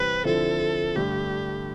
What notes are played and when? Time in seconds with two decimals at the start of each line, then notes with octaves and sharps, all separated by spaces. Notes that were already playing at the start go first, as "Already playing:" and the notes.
Already playing: C3 E3 G3 C4 B4
0.25 D3 F3 C4 E4 A4
0.96 G2 D3 A3 G4